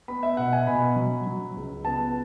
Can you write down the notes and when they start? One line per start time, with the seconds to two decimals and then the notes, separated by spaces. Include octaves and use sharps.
0.08 B3 B5
0.23 E5
0.37 B2 F#5
0.53 G#5
0.67 B2 B5
0.96 F#3
1.26 F#3
1.56 C#2
1.85 B3 A5